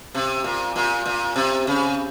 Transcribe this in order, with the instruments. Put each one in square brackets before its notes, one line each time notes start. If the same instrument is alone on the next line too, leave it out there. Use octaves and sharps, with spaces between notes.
[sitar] C3
A#2
A#2
A#2
C3
C#3